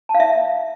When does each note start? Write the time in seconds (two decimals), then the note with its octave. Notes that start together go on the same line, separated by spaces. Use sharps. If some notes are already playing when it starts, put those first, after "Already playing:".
0.09 A5
0.15 F5
0.20 E5